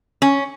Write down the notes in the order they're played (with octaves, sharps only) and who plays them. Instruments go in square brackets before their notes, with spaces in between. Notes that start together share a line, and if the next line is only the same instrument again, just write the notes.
[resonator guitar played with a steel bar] C#4